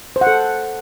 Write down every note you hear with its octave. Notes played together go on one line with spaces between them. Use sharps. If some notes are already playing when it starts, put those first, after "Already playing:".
C5
F#5
A4